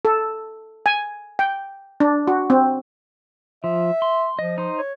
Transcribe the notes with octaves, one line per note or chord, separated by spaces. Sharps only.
A4
G#5
G5
D4
F#4
C4
F3 E5
C6
F3 D#5
D#4 C5
C#5